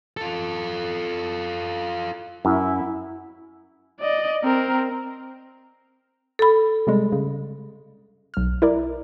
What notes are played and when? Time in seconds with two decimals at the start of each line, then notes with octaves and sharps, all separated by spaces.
0.17 F4 A4
2.45 F#2 E4
4.00 D5 D#5
4.44 C4 A#4
6.39 A4 B5
6.87 C3 G3 G#3
7.12 C#3
8.34 B1 F6
8.62 E4 A#4 D5